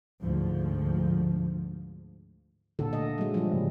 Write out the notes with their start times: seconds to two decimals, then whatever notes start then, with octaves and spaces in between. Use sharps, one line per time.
0.22 D2 G#2 F3
2.79 A#2 D3 A4
2.93 A3 D#5
3.18 F#3 G#3
3.34 F3 G3
3.53 A2 C#3 A#3